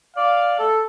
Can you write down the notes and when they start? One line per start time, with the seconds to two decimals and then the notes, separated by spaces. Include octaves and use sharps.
0.16 D5 F5
0.59 A4